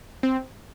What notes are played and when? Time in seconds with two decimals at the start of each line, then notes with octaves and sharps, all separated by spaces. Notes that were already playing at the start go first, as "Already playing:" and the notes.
0.23 C4